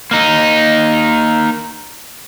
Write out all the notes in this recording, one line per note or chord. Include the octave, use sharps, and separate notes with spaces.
A#3 D#4